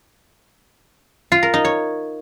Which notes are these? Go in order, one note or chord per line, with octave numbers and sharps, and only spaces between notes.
F4
A#4
D#4
C#5